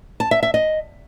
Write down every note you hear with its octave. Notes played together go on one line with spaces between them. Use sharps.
A5
E5
E5
D#5